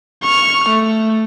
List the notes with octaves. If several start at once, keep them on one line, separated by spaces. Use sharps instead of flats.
C#6 F6
A3